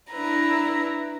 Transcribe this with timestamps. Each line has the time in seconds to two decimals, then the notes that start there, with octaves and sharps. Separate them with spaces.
0.11 D4 E4 B4 A#5